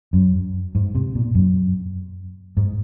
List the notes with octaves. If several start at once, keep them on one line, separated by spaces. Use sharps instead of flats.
F#2
G#2
C3
A#2
F#2
G#2